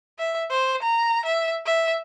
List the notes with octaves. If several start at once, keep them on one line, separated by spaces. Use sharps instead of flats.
E5
C5
A#5
E5
E5